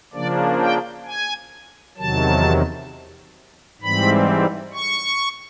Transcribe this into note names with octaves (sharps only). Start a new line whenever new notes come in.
C#3 F3 A#3 D4 D5
G5
G#5
E2 C3 D#3 F#3 A5
G#2 E3 G3 C4 B5
C#6